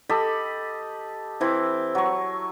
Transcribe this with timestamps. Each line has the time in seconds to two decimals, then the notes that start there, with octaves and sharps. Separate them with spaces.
0.09 G4 A4 D#5 B5
1.40 E3 C4 E4
1.95 F#3 C#6